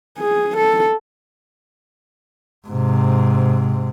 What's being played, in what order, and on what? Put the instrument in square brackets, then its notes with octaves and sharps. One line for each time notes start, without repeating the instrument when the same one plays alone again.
[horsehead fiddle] G#4
A4
[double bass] G#2 C3